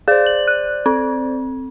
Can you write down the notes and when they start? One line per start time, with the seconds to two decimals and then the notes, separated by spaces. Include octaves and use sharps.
0.08 G#4 C5 D5
0.26 F#7
0.47 F#6
0.86 C4